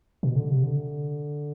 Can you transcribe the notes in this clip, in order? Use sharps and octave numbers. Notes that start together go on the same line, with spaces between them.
B2
D3
C3
D3